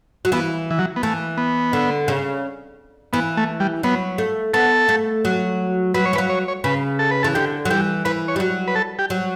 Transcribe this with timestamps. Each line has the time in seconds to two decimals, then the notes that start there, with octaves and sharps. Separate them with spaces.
0.25 F#3
0.32 E3 B3
0.71 E3
0.79 F#3
0.96 B3
1.03 E3 A3
1.38 B3
1.73 D3
2.08 C#3
3.13 E3 B3
3.37 A3
3.60 G3
3.83 F#3 B3
4.18 A3
4.54 B3 A4
4.89 A3
5.25 F#3
5.94 F#3 B4
6.06 C#5
6.13 E3 B4
6.18 F#3
6.30 C#5
6.48 C#5
6.64 C#3 B4
6.99 A4
7.11 B4
7.23 E3 A4
7.35 D3 G4
7.65 F#3
7.70 E3 G4
8.05 E3 B4
8.28 C#5
8.36 G3
8.40 F#3
8.68 B4
8.75 A4
8.99 G4
9.10 F#3